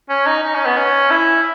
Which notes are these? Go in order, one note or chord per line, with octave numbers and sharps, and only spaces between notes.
C#4
D#4
D#4
C#4
B3
C#4
E4